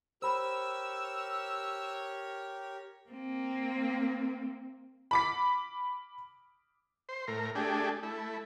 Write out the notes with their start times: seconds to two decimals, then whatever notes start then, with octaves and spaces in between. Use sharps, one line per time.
0.22 G4 A#4 C5 C#5 B5 E6
3.10 A#3 C4
5.11 B5 D6 B6
7.09 C5
7.28 A2 A#4
7.55 A3 D4 G4 G#4
8.03 A3 E4